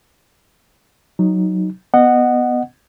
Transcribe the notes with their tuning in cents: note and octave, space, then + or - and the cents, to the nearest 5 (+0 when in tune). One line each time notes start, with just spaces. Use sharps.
F#3 +0 D#4 +0
B3 +0 D#5 -20 F#5 +0